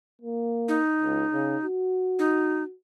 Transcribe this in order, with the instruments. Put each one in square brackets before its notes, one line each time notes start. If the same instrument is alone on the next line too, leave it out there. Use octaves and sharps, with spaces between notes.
[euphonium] A#3
[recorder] D#4
[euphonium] C#2
C#3
F#4
[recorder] D#4